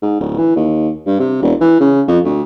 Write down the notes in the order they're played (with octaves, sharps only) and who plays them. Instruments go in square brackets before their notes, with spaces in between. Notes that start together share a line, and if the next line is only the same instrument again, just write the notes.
[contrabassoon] G#2
D1
E3
D#2
G2
C3
E1
E3
C#3
F2
D2